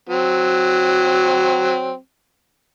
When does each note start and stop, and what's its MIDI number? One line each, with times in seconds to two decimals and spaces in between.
0.09 1.96 54
0.09 1.96 60